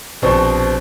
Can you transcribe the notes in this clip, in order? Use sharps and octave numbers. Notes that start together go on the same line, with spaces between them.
A#1 B2 C4 A5 C#6